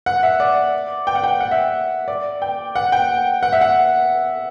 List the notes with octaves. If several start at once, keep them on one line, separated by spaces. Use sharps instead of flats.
F#5
E5
D5
G5
F#5
G5
F#5
E5
D5
G5
F#5
G5
F#5
E5
F#5